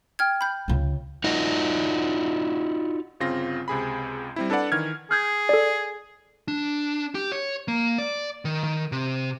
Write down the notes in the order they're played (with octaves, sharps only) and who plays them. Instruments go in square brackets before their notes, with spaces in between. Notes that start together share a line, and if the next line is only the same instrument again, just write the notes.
[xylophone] G5 F6 G#6
B5 G6
[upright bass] C#2 C#3
[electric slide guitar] D#4 F4 F#4 D#5
[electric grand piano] G1 C#3 C4 F4 A#6
C#2 C3 G#4 B5
G3 C4 E4
D4 A4 B4 D5 F#5
D#3 E3 F6 G#6
[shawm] G#4 [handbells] F6 G6 G#6
[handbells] A4 D5
[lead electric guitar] D4
G4
C#5
A#3
D5
D#3
D#3
C3